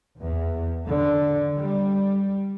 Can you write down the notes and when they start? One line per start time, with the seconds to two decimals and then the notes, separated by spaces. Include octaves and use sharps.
0.20 E2
0.87 D3
1.56 G3